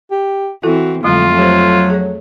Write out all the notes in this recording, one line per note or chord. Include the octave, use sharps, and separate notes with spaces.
G4
E3 C4 E4 F#4 A4
F2 D3 F#3 G#3 A3 F4
F#3 G4 C5
G#4 C#5